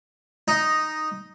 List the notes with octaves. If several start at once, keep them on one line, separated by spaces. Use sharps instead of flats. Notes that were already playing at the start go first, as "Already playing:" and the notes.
D#4